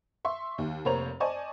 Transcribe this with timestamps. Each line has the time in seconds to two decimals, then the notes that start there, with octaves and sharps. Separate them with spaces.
0.25 E5 C6 C#6
0.58 D#2
0.85 F1 A#3 C5 C#5 A#5 F7
1.20 C5 D5 D#5 G#5 A5 C#6